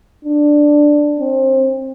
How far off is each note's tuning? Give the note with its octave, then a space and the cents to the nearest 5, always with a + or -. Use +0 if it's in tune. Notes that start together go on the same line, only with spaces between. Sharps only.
D4 +5
C4 +25